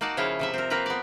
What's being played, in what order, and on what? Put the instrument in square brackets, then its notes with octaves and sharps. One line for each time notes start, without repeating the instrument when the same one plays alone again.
[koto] A#3 D#4 F#4 D5 A5
C#3 F3 E4 C#5 F5
C3 F3 E5
C4 A#4
A#3 C4 A#4 B4 A#5
B3 D5